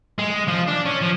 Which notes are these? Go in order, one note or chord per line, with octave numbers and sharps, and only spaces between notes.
G#3
F3
D4
C#4
F3